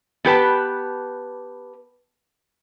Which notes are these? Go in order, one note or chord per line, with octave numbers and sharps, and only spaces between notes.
B3 G4 B4 A5